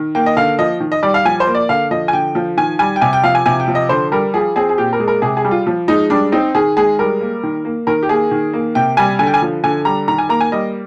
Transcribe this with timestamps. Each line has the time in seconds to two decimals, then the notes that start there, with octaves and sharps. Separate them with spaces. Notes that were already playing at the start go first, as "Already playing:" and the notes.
Already playing: D#3
0.15 A#3 G5
0.26 D#5
0.37 D3 F5
0.59 F3 D#5
0.80 D#3
0.92 D#5
1.03 G3 D5
1.14 F5
1.25 F3 G#5
1.40 C5
1.47 A#3
1.55 D5
1.69 D3 F5
1.91 F3 D#5
2.08 G#5
2.13 D3 G5
2.35 F3
2.57 D#3 G#5
2.79 G3 G#5
2.96 G5
3.01 C3 G#5
3.13 G5
3.24 F3 F5
3.35 G#5
3.46 C3 G#5
3.60 G5
3.68 F3
3.75 D#5
3.89 D3 C5
4.12 G3 A#4
4.34 F3 G#4
4.56 C4 G#4
4.69 G#4
4.78 A#2 G4
4.93 A#4
5.00 G#3
5.08 A#4
5.22 C3 G#4
5.37 G#4
5.45 G3
5.51 F4
5.67 F3
5.88 G#3 D#4
6.10 G3 D4
6.32 C4 D#4
6.55 D#3 G#4
6.77 G#3 G#4
6.99 G3 A#4
7.21 A#3
7.43 D#3
7.65 A#3
7.87 D#3 A#4
8.03 G4
8.09 A#3 G#4
8.31 D#3
8.53 A#3
8.75 C3 G5
8.97 G3 G#5
9.19 D3 G#5
9.27 G5
9.34 G#5
9.42 F3
9.64 D3 G#5
9.85 G3 A#5
10.08 D#3 A#5
10.18 G#5
10.29 A#3 A#5
10.41 G#5
10.52 G3 D#5